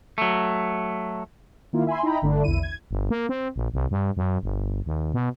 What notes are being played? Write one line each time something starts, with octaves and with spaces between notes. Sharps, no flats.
F#3 A3
D#3 A#3 E4 F4
E5 G#5 B5 C6
D#4 E4 D#5 G5 A#5 B5
G1 D3 A3 D4
A#1 E2 E4 D#7
G#6
G1
A#3
C4
A#1
C2
G2
F#2
G1
D#2
B2